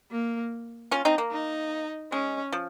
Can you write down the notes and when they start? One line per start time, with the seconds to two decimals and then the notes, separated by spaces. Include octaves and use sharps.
0.11 A#3
0.91 C#4 F4
1.05 C4 D#4
1.18 A#3
1.32 D#4
2.12 G#3 C#4
2.53 F3